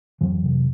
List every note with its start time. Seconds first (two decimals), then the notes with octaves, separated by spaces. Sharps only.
0.21 F2 E3 F#3
0.44 C3